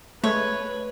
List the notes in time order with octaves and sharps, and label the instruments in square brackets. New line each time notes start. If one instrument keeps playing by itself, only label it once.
[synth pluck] G#3 A3 [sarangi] B4 [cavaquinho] C#5